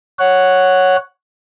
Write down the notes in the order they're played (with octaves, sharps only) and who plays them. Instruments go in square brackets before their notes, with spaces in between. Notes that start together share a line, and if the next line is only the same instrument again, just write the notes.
[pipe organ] C#5 F#5